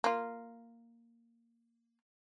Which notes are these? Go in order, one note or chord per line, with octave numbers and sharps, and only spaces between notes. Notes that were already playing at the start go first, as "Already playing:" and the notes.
A#3 F4